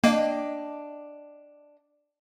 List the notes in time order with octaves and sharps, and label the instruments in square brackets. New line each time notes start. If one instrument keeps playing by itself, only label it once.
[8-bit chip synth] A#3 [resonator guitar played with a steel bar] D4 D#5 G5